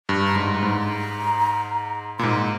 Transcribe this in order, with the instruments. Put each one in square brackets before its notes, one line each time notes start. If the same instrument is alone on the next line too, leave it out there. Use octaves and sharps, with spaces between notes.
[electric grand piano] G2
[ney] A#5
[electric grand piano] G#2 [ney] C6
[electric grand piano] G2
[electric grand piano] G#2 [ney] A#5
[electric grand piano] A#2 [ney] C6
[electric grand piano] G#2 [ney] A#5